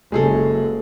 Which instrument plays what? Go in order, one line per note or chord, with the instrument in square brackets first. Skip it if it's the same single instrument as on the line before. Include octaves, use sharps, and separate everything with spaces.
[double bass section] F#1 [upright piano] G#3 G#4 A4